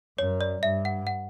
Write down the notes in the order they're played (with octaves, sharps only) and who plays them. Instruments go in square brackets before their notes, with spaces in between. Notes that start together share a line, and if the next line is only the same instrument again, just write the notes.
[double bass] F#2 [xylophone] C#5
[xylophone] D5
[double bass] G2 [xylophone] E5
[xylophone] F#5
F#5